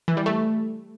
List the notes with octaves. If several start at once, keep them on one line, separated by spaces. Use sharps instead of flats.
E3
G3
A3